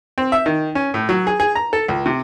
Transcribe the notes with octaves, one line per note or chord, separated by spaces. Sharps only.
C4
E5
D#3
C#4
A2
F#3
G#4
G#4
A#5
A4
C#2
C3